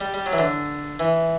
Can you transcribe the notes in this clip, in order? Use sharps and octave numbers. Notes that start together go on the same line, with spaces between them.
G3
G3
F#3
E3
D3
E3